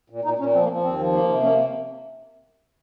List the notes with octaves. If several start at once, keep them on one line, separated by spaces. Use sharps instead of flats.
A#2
A#2 D#4
A#2 C#4
F3 C4
A#3
F3
D#2 C4
F3
A#3
C3
A#3 C#4